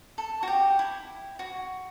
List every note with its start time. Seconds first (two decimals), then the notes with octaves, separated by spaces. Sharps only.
0.18 A4
0.43 F#4
0.48 G4
0.79 E4
1.39 F#4